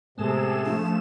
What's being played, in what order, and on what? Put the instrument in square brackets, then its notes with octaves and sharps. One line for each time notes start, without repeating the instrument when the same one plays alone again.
[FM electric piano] A2 G#3 B3 [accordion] C3 [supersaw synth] G#4 A4 E7
[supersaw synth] F3 A3 E7 [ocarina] D4